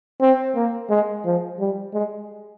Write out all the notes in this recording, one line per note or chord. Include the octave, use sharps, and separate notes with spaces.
C4
A#3
G#3
F3
G3
G#3